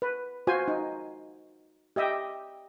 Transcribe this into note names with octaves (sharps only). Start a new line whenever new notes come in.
B4
F4 F#4 C5 G#5
D#4
G4 D#5 E5 G5